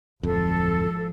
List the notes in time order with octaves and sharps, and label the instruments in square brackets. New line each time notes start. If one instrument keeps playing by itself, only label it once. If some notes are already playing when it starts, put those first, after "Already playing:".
[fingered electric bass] D1 F2 [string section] G#1 F3 [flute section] A4